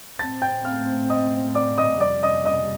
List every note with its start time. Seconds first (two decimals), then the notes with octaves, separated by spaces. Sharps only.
0.19 A2 A3 C4 A5 A6
0.42 G5 G6
0.65 F5 F6
1.10 D#5 D#6
1.55 D5 D6
1.78 D#5 D#6
2.00 F2 C3 G3 D5 D6
2.23 D#5 D#6
2.45 D#5 D#6